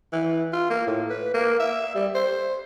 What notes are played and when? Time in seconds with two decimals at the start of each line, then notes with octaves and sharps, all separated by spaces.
0.12 E3
0.53 F4
0.70 A#3
0.87 A2
1.10 B4
1.34 A#3
1.59 E5
1.95 G3
2.15 C5